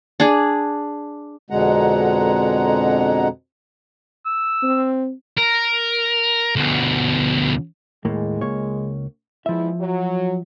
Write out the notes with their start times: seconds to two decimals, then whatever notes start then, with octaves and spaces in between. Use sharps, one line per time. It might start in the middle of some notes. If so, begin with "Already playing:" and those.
0.20 D4 G#4
1.51 F2 B2 D3 G#3 F#5 A#5
4.26 E6
4.63 C4
5.37 A#4
6.56 D2 B2
8.05 D#2 A2 G#3 A#3
8.41 C#2 A#3 C#5
9.46 E2 F3 G#3 E4 E5
9.80 F#3